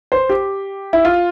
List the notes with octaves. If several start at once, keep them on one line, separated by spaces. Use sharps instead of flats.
C5
G4
E4
F4